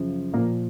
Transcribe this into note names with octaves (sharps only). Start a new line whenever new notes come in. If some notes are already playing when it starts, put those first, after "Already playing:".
Already playing: F#2 C#3 F3
A#2 F3 A#3